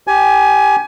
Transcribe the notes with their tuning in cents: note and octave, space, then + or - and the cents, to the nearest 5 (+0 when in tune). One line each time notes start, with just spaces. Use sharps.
G4 +0 G#5 +20